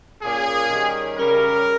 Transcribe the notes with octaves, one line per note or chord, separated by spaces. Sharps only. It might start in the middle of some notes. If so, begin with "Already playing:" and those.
A#2 A#3 C#4 G#4
D#3 G3 C#4
C#3 G3 C#4 A#4